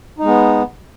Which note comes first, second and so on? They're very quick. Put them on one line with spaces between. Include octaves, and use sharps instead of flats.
D#4 G#3 B3